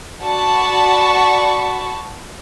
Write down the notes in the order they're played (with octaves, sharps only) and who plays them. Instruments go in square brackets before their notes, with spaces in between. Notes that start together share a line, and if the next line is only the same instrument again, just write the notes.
[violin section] F#4 D5 A5 B5 C#6